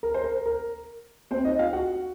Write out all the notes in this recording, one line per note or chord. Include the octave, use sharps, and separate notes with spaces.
A#4
C5
A#4
A#4
C4 C5
D#4 D#5
F4 F5
F#4 F#5